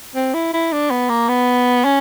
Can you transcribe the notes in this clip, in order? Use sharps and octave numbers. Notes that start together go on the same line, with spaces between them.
C4
E4
E4
D4
B3
A#3
B3
C#4